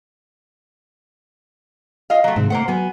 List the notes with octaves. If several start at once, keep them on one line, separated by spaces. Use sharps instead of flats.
F4 D#5 F5
F#3 A3
G#2 C3 D#3 C4
A3 A#3 C5 F#5
F#3 B3 G#5